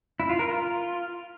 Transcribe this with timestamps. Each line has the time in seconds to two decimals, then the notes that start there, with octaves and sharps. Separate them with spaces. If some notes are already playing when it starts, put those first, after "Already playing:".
0.20 E4
0.29 F4
0.39 A#4
0.49 F4